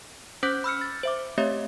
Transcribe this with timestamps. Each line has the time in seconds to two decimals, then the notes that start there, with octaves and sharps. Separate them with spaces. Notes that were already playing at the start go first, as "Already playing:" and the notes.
0.43 C#4 C5 D6 F#6 G6 B6
0.64 B5 E6 F6 C#7
0.81 A6
1.03 C5 E5 D6
1.38 A3 C4 G4 C#5 D#5 E5